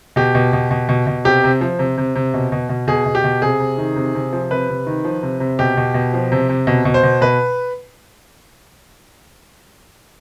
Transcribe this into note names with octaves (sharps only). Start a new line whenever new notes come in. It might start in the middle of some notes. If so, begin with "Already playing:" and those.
B2 G4
B2
B2
B2
B2
B2
C3 G4
C3
F3
C3
C3
C3
B2
B2
B2
B2 G#4
B2
G4
B2
C3 G#4
C3
D#3
C3
C3
F3
C3 B4
C3
D#3
F3
C3
C3
B2 G4
B2
B2
F3
C3
C3
B2
B2
C5
B2
B2 B4